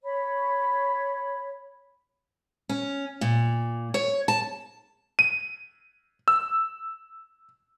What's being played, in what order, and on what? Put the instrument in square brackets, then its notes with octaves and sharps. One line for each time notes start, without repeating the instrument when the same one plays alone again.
[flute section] C#5 B5
[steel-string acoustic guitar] C#4
A#2
C#5
A5
[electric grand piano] D#7
E6